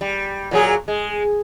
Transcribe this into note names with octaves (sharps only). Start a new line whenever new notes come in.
G3
A#2 F#3 G#4
G#3